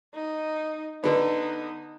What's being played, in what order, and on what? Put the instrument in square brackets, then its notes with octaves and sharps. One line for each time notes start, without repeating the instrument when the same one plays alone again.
[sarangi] D#4
[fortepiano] D3 B3 [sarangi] D#4